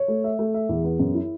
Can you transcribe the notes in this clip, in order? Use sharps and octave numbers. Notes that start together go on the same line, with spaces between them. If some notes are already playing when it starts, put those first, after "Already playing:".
Already playing: C#5
A3
E5
A3
E5
E2
B3
F#2
E4